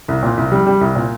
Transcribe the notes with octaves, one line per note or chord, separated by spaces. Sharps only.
C2
A#2
C2
G3
G3
C2
A#2